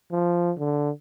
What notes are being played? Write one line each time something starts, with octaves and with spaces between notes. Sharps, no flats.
F3
D3